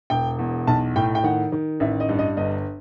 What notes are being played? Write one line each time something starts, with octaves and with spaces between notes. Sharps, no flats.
E1 G5
E2
B1 A5
A2 G5
G5
D#3 F#5
D#3
A1 E5
D#5
G2
D#5
G1 D#5